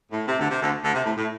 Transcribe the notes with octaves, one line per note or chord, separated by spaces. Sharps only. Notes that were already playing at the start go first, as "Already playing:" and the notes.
A2
C3
D2 D3
C3
D2 D3
D2 D3
C3
A2
A2